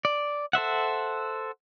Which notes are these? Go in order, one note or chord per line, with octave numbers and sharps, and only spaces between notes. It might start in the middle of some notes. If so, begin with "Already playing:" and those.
D5
A4 C5 E5 F#5